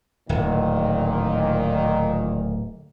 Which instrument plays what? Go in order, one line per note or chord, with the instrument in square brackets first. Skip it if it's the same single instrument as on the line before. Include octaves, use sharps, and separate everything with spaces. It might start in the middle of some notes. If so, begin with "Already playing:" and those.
[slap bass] D1 [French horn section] A#2 D#3